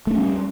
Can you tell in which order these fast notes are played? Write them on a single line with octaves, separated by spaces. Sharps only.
A3 D4 C#4 G3